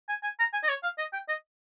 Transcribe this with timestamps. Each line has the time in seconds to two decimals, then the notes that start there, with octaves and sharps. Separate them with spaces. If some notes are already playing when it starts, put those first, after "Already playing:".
0.09 G#5
0.23 G#5
0.39 A#5
0.53 G#5
0.64 D#5
0.69 C#5
0.83 F5
0.98 D#5
1.13 G5
1.28 D#5